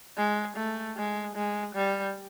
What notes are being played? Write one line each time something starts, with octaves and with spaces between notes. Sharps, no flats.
G#3
A3
G#3
G#3
G3